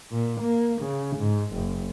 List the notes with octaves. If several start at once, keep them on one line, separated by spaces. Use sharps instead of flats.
A#2
A#3
C#3
G#2
F#1